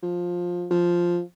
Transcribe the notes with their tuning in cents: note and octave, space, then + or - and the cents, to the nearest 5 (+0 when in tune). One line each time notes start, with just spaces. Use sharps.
F3 +15
F3 +0